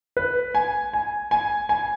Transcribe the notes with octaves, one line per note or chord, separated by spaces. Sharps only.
B4
G#5
G#5
G#5
G#5